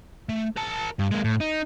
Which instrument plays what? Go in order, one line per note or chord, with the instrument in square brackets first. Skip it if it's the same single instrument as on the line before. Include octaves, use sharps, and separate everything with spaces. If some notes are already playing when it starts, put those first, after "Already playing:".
[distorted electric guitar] A3
A#4 A5
G2
G#3 A#3
A2
D#4